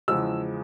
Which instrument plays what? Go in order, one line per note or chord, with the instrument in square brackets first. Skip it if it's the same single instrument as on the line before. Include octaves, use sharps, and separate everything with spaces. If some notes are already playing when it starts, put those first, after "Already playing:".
[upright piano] E2 C#3 F3 G#3 E6